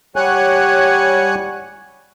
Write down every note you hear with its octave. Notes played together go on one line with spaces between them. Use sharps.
G3 C#5 F#5 G#5 F#6